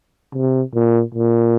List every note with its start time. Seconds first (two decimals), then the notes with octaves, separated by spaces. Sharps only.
0.33 C3
0.74 A#2
1.15 A#2